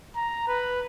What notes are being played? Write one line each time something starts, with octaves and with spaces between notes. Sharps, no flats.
A#5
B4